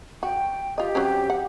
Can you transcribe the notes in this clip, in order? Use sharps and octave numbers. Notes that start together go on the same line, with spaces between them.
F#4 G5
F4 G4 D#5
F#3 C4 C#4
F#5